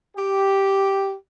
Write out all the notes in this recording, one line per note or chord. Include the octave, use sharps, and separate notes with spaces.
G4